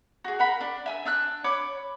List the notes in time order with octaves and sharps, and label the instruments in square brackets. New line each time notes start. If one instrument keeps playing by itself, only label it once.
[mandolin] F#4 G#4
A#4 F#5 B5
D4
E5 G#5 E6
D4 E6 F#6
C#5 B5 D6